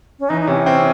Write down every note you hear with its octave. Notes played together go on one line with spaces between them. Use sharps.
C#4
E3 D#4
D#4
C3 C#4
C4